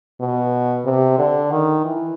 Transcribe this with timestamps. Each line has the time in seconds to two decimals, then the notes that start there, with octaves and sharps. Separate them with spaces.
0.20 B2
0.85 C3
1.19 D3
1.51 D#3
1.85 E3